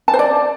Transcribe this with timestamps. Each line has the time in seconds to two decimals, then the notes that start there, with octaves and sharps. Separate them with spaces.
0.08 A5
0.13 C5
0.19 D5